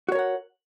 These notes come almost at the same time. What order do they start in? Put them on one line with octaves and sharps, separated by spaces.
F#4 C#5 A#4 F#5